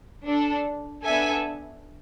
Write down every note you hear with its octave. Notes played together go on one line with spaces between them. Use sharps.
D4 A4
B3 D4 A4 E5 G#5